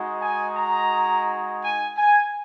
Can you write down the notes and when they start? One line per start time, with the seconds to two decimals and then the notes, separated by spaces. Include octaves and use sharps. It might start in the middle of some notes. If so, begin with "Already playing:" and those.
Already playing: G#3 D#4 F#4
0.21 G#5
0.56 A#5
1.63 G#5
1.97 G#5